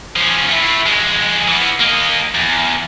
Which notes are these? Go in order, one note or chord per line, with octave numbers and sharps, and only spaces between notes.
F3 C#4
A3 E4
F2 G#3
E3 B3
A#3 D#5
E2